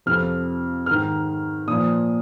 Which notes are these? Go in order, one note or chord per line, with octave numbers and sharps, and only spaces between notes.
F2 C3 F3 F6
G#2 D#3 F6
A#2 F3 D#6